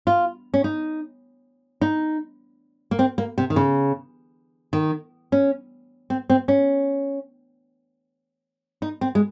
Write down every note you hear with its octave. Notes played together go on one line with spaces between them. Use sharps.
F4
C#4
D#4
D#4
A#3
C4
A#3
C3
D#3
C#3
D#3
C#4
C4
C4
C#4
D#4
C4
G#3